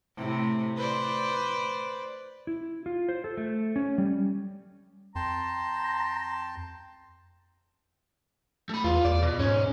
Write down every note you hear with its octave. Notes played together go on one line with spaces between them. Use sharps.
A2 C3
B4 C5 D5
E4
F4
C5
A4
A3
C#4
G3
F2 G5 A5 A#5 C6
A3 B5
E2 F4
E2 D5
B2
G#2 C#4